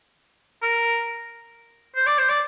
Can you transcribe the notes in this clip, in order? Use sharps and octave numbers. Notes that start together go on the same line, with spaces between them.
A#4
C5
D5
C5
D5